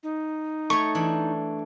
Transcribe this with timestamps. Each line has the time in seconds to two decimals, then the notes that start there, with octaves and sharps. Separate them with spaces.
0.03 D#4
0.70 A3 C#5 C#6
0.95 E3 D4